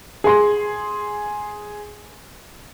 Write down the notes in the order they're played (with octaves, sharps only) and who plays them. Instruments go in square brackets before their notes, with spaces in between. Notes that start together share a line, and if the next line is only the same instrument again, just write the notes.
[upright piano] G#4 C6